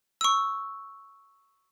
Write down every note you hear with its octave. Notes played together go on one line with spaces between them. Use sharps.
C#6 E6